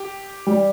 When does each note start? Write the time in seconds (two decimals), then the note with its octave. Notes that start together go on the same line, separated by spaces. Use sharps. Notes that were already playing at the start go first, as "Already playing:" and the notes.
Already playing: G4
0.47 G3